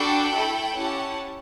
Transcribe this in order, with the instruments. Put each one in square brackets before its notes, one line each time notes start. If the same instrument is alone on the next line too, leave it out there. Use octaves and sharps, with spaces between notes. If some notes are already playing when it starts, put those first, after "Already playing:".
Already playing: [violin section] D4 F#4 A4 G5 B5
A3 E4 A4
C#4 E4 G4 F#5 A5